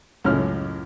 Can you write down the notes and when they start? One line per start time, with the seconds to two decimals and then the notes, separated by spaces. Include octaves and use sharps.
0.24 C#2 F#2 A2 C#4 F6